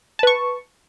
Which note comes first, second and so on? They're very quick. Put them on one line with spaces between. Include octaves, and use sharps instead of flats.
A5 B4 C#6